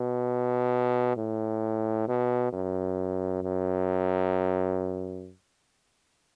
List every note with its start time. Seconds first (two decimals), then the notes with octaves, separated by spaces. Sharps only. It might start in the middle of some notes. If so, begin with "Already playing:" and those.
Already playing: B2
1.17 A2
2.08 B2
2.53 F#2
3.43 F#2